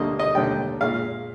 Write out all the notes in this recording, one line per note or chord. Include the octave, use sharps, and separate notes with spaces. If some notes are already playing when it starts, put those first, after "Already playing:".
Already playing: D2 D3 G3 A#3 D#5
D#5
D#2 D3 G3 G5
A#2 G#3 F5